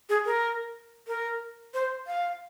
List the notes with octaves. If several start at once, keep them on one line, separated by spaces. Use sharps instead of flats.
G#4
A#4
A#4
C5
F5